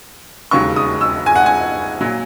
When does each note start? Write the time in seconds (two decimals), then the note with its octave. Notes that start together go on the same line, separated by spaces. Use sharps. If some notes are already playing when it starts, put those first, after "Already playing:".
0.51 E1 D#2 C#3 F#3 C#6
0.76 D#6
1.01 E6
1.26 G#5
1.35 F#5
1.46 G#5
2.01 A#2 F#3